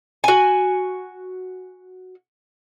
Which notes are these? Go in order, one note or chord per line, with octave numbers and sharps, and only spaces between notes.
F#4 G#5